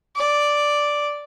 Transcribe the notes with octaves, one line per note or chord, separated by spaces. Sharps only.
D5